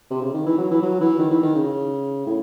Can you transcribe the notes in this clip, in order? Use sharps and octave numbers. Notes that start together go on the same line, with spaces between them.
C3
C#3
D#3
E3
F#3
E3
F#3
E3
D#3
E3
D#3
C#3
A2